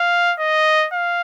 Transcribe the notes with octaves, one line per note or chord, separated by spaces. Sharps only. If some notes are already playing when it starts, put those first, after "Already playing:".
Already playing: F5
D#5
F5